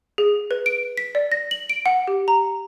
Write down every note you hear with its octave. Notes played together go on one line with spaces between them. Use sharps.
G#4
B4
D7
B6
D5
A#6
F#7
D7
F#5
G4
A#5